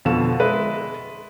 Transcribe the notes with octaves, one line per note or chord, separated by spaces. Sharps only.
F2 B2 D3 A4 F5 E7
G#3 B4 E5